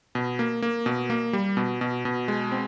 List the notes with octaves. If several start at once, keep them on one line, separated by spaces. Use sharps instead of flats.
B2
A#3
A#3
B2
A#3
G3
B2
B2
B2
G#3
C4